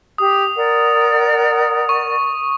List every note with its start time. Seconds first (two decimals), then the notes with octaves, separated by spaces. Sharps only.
0.18 G4 D#6
0.57 A#4 D5 F#5
1.89 C#6